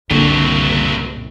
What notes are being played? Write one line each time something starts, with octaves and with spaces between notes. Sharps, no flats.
F#1 C2 G2 A#2 D3 F#3